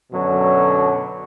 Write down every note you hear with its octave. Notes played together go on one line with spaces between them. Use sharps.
F#2 B2 D3 F#3